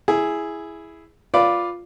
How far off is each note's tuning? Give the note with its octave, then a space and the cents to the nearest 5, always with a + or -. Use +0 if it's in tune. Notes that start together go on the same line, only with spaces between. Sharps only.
E4 +0 G#4 +0
F4 +0 B4 +0 D5 +0